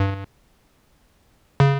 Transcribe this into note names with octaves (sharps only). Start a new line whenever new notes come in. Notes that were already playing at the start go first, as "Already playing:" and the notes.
Already playing: G2
C#3